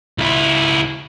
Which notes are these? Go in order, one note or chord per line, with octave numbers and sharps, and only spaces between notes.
C#2 E4